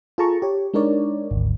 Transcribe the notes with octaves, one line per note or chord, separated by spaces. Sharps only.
F4 G#4 A4 A5 A#5 C#6
G4 C#5
G#3 D4 D#4 A#4 C#5 D5
G#1 D2